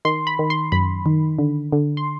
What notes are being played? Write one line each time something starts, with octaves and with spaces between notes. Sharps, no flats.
D#3 C6
B5
D#3
C6
F#2 B5
D#3
D3
D3
C6